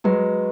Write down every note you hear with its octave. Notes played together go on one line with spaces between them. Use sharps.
F#3 G#3 F#4 B4 D#5